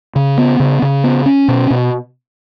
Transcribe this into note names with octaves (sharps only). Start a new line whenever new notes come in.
C#3
B3
C#3
C#3
B3
C#4
B2
B2